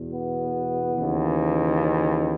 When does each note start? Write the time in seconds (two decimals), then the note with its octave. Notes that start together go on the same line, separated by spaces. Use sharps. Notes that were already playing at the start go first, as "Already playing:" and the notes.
Already playing: E2 B2
0.12 B3
0.94 D#2 C#3 E3
1.77 C#4